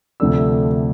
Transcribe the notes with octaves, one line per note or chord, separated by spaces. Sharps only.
D2 C3 F3 A3 D4 E6